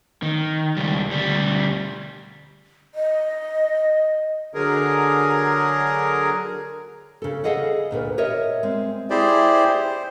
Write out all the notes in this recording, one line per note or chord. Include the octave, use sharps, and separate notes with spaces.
D#3
C#2 G3
D2 G3
D#5
D3 F#3 G#4 A#4
C#3 A4
G#4 A4 D#5 F5 F#5
D2 A#2 A#4 B4
A#4 C#5 D#5 E5
G#3 C4
E4 G4 G#4 C5 D5
C5